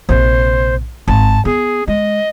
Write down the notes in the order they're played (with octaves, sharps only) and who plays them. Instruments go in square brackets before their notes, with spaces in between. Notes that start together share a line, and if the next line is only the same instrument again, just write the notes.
[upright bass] A#1 C3 [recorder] C5
[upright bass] G#1 [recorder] A5
[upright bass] B3 [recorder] G#4
[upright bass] G#3 [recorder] D#5